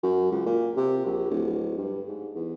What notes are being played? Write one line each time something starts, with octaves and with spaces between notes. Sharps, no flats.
F#2
C#2
A#2
C3
A#1
D1
G2
G#2
E2